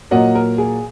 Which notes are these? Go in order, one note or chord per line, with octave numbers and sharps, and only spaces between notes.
A#2 F#3 A#3 D#5 F#5
A#4
G#4